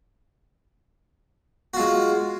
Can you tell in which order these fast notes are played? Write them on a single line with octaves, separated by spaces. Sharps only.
F#4 F4 G#3